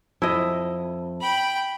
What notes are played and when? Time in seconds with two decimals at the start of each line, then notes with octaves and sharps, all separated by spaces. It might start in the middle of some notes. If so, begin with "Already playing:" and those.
0.22 F2 E4 D#5
1.21 G5 B5